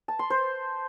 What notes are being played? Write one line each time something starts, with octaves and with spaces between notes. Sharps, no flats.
A5
C6
C5